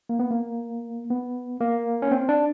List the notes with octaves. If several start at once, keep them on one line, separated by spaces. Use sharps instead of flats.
A#3
B3
A#3
B3
A#3
C#4
C4
D4